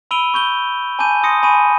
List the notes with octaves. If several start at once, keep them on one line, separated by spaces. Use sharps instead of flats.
B5 E6 D7 D#7 F7 G7
C#6 G6 G7
G#5 A5 B5 D6 G6 D#7
C6 D#6 A#6 C#7
G#5 B5 C#6 D#7